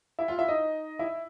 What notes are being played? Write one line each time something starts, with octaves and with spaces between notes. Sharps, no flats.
E4 E5
F4 F5
E4 E5
D#4 D#5
E4 E5